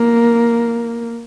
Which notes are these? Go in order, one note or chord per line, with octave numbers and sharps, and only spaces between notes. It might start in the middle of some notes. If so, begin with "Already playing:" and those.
Already playing: A#3